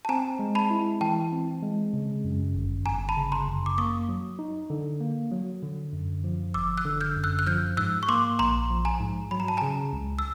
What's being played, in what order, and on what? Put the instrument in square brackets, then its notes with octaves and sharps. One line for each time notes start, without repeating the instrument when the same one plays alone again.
[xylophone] A5
[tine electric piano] C4 [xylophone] G#5 A#5
[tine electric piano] G#3
[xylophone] A5 B5
[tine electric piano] E4
[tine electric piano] E3 [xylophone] G5 A5
[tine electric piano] C4
G#3
C#3
F#2
G1
[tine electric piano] G1 [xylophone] G#5 A#5
[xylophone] A5 B5
[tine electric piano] C#3
[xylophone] A#5 C6
[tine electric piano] F#2
[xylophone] D6
[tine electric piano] A#3 [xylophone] C#6 D#6
[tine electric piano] F#3
D#4
D3
A#3
F#3
D3
F#2
F3
[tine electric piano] G1 [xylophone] D6 E6
[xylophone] E6 F#6
[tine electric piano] D3
[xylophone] F6 G6
[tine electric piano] F#2
[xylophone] E6 F#6
F#6
[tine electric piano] F3 [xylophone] F6 G6
[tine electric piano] G#2 [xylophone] E6 F#6
[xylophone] C#6
[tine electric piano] A#3 [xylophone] C6 D6
[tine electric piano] A#1 [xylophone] A#5 C6
[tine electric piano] F3
[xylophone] G#5 A#5
[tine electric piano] G#2
[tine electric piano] F#3 [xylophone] B5
[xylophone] A#5
A5
G#5 A#5
[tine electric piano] C#3
C#2
[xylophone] E6